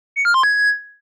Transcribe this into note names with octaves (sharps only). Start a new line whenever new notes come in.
C#7
F6
C6
G#6